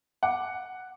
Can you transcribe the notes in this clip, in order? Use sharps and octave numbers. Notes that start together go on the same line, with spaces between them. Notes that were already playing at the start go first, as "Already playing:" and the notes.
F#5 D6